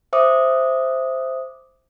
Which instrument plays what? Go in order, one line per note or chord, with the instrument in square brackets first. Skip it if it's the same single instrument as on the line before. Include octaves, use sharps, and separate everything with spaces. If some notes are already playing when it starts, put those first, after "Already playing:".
[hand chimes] C5 E5 D6 D#6